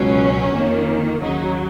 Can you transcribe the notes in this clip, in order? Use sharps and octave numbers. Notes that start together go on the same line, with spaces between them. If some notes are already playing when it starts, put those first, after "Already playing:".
Already playing: C#2 B2 F#3 C#4
F2 D#3 A#3
D#2 C#3 F#3 D#4